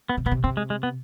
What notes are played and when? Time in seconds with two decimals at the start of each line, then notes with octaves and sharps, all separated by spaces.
0.09 B3
0.17 C3
0.26 B2 B3
0.31 C3
0.44 C3 C4
0.57 G#3
0.70 G#3
0.83 B3